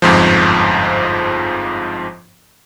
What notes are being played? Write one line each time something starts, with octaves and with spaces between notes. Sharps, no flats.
G1 F2 G#2 F3